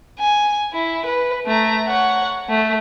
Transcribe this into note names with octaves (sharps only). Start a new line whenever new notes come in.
G#5
E4
B4
A3 A#5
C#5 F#5
A3